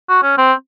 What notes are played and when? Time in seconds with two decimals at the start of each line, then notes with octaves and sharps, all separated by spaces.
0.09 F#4
0.23 C#4
0.38 C4